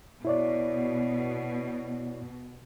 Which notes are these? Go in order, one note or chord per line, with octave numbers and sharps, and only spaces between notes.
B2 E4 C#5 D5